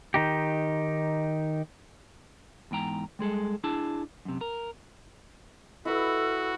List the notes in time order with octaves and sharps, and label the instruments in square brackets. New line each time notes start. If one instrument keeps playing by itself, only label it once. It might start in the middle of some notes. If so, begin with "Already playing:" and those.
[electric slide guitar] D#3 D#4 G4
[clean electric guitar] E2 G#2 G5 A#5
G3 G#3 G#4 A4
D4 E4 G#4 A5
F#2 C3
A#4
[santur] E4 B4 [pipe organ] F#4 [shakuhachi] A4